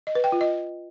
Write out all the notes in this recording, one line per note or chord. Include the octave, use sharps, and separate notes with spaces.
D#5
B4
G5
F4
D#5